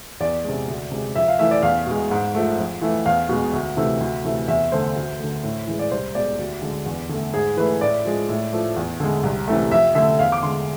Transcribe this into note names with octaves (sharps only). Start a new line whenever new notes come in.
E2 D5
C3 G#3
D2
C3 G#3
F2 E5
F5
E3 A3 E5
D5
E2 F5
B2 G#3
G#2
F3 A3
F2
E3 A3
E2 F5
B2 G#3
D2
C3 E3 A3
D2
C3 E3 A3
E2 E5
D3 A3 C5
D2
D3 A3
A2
E3 G#3
D5
C2 C5
B2 G#3 D5
D2
D3 G#3
E2
D3 A3
G#2 G#4
E3 A3 B4
A2 D5
F3 G#3
A2
F3 A3
E2
D3 G#3
C2
C3 E3 A3
F2 E5
D3 A3 E5
E2 F5
D6
D3 G#3 C6